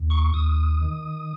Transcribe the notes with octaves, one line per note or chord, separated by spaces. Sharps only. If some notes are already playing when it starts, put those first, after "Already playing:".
Already playing: D#2
C#6
D#2 D#6
D#3